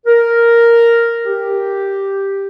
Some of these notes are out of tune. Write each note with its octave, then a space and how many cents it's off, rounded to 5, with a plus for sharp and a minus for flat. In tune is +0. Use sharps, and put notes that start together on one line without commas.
A#4 +0
G4 +0